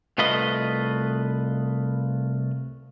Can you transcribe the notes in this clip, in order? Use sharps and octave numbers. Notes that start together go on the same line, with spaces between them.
C2 A3 F4 B4 D#5